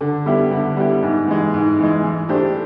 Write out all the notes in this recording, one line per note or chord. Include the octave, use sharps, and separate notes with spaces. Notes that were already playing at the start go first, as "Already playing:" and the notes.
D3
G3 B3 E4 G4
D3
G3 B3 E4 G4
G#2
E3 G#3
G#2
E3 G#3
E3
A3 D4 G4 C5